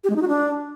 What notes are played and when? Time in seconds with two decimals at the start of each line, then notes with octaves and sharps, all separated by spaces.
0.04 G4
0.10 G#3
0.16 D#4
0.22 F#4
0.28 D4